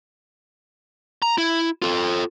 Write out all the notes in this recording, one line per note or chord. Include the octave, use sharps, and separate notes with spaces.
A#5
E4
F4 A4